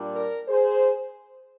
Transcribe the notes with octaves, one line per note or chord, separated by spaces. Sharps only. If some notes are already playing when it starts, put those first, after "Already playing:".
Already playing: A#2 G3 D4
A#4 D5
G#4 C5